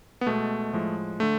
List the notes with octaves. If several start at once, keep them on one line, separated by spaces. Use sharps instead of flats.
B3
B2 G#3 A3
A2 F3 G#3
D3 A3